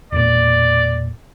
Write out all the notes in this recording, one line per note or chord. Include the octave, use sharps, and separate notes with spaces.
E1 A#2 D5